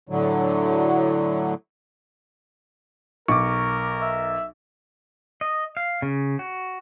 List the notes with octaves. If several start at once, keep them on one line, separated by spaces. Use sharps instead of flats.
A2 D3 F#3
B1 A#4 C#6 D6
E5
D#5
F5
C#3
F#4